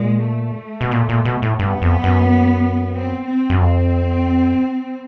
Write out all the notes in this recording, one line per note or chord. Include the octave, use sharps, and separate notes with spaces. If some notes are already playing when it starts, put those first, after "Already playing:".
Already playing: A#2 G#3
A3
B2
A#2
A#2
B2
A2
G2 B3
F2
F#2
C4
C4
F#2
F2 C4